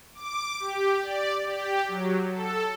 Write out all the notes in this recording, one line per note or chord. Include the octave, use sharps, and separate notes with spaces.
D6
G4
D5
G4
F#3
A4